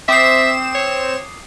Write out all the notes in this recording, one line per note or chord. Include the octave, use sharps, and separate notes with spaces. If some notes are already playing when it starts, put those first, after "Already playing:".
C4 E5 D6 D#6 C7 E7
C#5